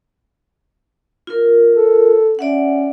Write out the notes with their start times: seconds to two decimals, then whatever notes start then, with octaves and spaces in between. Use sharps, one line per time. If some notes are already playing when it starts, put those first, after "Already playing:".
1.27 F4 A#4
1.75 A4
2.39 C#4 D5 E5 F#5